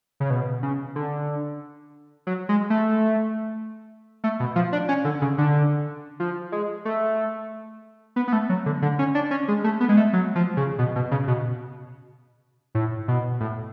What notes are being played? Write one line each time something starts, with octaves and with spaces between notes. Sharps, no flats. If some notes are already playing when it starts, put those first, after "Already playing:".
C#3
B2
C#3
D3
F#3
G#3
A3
A3
B2
F3
D4
C#4
D3
C#3
D3
F3
G#3
A3
B3
B3
A3
F#3
D3
D3
C#4
D4
C#4
G#3
A3
B3
G#3
A3
F#3
F3
C#3
B2
B2
C#3
B2
A2
B2
A2